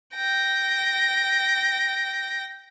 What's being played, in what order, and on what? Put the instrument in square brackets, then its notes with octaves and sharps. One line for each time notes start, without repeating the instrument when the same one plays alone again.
[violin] G5 A#6